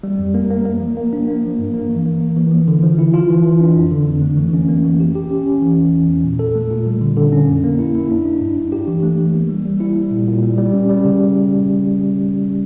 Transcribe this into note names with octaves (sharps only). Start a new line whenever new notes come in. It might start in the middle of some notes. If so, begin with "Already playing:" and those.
G3
F2
A#3
A#3
A#3
F3
A#3
D4
A#3
F3
G2
A#3
E3
A#3
A#3
E3
F3
D3
F3
E4
F4
E3
E3
D4
F2
D3
F2
A3
E3
C#4
A#3
E3
G4
G4
C#4
C#4
E3
E2
E2
E2
A#2
A4
A3
A#2
G3
D3
D3
C#4
F2
A#3
E4
E4
D4
D4
G2
D4
G4
E3
A3
E3
A#3
G3
G3
E4
G3
A#2
A#2
G3
G3
C#4
G3
C#3